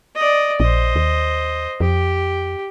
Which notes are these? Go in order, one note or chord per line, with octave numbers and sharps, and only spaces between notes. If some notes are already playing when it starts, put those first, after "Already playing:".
D5 D#5
A#1 C5 D#5
D#2
F2 G4